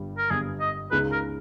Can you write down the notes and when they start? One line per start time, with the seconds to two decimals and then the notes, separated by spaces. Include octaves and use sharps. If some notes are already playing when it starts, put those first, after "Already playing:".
Already playing: G1 G2 G3
0.18 A#4
0.30 G1 G2 G3 G#4
0.60 D#5
0.91 C#2 C#3 G#3 D#4 G#4 B4
1.12 A#4